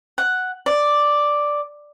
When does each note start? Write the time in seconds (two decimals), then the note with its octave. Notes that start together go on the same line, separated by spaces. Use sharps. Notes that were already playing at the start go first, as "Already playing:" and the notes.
0.18 F#5
0.66 D5